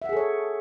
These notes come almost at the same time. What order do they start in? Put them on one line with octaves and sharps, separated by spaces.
E5 F#5 G#4 A4 C#5